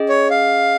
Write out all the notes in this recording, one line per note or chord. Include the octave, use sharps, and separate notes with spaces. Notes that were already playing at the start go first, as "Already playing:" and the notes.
Already playing: C#4 G#4 D#5
C#5
F5